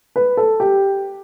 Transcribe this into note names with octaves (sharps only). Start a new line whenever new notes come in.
B4
A4
G4